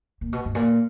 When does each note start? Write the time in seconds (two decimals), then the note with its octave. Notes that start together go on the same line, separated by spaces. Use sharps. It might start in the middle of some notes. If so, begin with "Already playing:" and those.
0.21 A#2
0.33 B2
0.45 G2
0.55 A#2